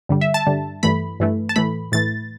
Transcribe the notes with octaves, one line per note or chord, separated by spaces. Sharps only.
G2 D3 G3
E5
A5
G2 D3 G3
G2 E3 A3 B5
G2 E3 A3
A5
A2 E3 A3 B5
A2 E3 A3 A6